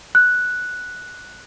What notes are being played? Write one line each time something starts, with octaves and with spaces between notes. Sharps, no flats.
F#6